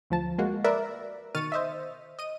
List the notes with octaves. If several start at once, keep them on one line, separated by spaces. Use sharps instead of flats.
D2 F3 A5
G#3 A#3 F#4
A#4 B4 D5 E5
B2 D#3 C#6 F6 A6 D#7
C5 D#5 E5
D#5 D#7